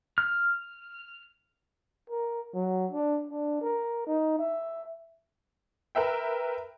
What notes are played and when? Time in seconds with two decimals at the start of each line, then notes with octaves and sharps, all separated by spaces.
0.18 F6
2.10 A#4
2.54 F#3
2.91 D4
3.27 D4
3.62 A#4
4.07 D#4
4.39 E5
5.95 A#4 B4 E5 G5